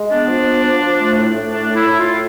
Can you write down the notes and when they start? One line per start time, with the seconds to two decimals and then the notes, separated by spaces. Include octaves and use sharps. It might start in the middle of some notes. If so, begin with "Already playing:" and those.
Already playing: G#3
0.10 B3 D4
0.28 F3
0.46 B3
0.63 F3
0.80 F3
0.98 A3
1.16 A2
1.33 A2
1.51 A3 D4
1.68 A2
1.74 E4
1.86 A2
1.98 A2 F4